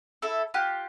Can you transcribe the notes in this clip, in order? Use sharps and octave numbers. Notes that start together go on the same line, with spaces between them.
E4 A4
F4 G4 F#6